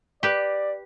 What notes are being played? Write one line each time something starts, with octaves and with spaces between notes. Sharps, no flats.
G4 B4 D5